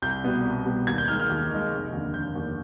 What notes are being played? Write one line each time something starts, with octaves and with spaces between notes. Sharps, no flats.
C2 G6
B2 G3 B3
C2
B2 G3 B3
D#2 G#6
G6
D#3 G#3 F6
F6
D#2
D#3 G#3
F1
D#2 D3
F1 G6
D#2 D3